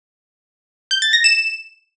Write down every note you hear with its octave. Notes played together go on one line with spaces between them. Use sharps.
G6
A6
A#6
E7